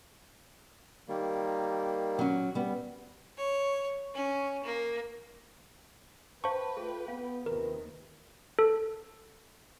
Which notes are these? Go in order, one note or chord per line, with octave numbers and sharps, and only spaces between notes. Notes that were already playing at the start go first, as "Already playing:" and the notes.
D#3 G3 A#3
F#3 C#4
G3 B3
C#5
C#4
A#3
B4 C5 F5 G5 A5 C#6
A3 F4 G#4
B3 F5
D#2 C3 D#3 F4 A#4 B4
A4